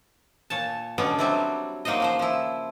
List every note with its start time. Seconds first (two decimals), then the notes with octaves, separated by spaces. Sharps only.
0.50 A#2 C#5 A5
0.98 B2 D3 G3 B3 C#4
1.18 F#3 G3 C4 D4 E4
1.85 F#3 A#3 D#4 C5 D#5
2.00 C#3 F3 C5
2.19 F3 E4